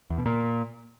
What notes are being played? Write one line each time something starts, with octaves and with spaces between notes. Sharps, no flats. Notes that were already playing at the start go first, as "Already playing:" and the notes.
E2
B2
A#2